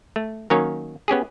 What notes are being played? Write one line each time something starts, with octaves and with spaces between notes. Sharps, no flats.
A3
D#3 F#3 A#3 C#4 D#4 C#5
B3 C#4 G4 G#4